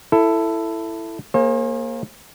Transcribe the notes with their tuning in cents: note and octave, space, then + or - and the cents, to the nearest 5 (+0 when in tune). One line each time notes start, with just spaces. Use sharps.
E4 +10 A4 +10
A#3 +0 G#4 +0 C5 +45